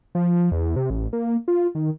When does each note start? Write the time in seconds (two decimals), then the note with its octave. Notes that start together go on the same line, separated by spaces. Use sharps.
0.15 F3
0.52 E2
0.76 C3
0.90 A1
1.13 A#3
1.48 F4
1.75 D#3